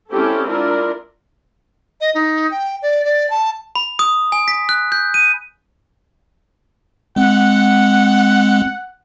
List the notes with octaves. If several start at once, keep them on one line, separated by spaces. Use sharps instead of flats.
G#3 C4 C#4 E4 G4 A4
D4 E4 F4 A#4
D#5
D#4
G5
D5
D5
A5
B5
D#6
G#5
B6
F#6
G6
D#7
G#3 C4 F#5